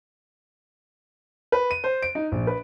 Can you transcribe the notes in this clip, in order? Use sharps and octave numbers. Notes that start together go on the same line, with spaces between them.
B4
D#7
C5
D7
D#4
A#1
B4